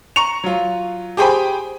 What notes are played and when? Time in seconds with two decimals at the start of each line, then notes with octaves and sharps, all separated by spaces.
0.16 A#5 C#6 C#7 F7
0.44 F#3 F4
1.17 G4 G#4 C5 G5 G#5 B5